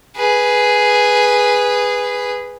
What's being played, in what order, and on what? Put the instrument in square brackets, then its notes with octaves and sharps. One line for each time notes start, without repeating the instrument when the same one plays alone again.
[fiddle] G#4 B4